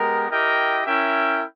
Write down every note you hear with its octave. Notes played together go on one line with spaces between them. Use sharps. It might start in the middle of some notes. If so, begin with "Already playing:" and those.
Already playing: G#3 B3 G4 A#4
E4 G4 A#4 D#5 G5
C#4 E4 A#4 E5 G5